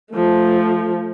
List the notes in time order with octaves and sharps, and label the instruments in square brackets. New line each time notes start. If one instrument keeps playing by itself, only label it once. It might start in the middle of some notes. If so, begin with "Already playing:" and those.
[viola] F3 A3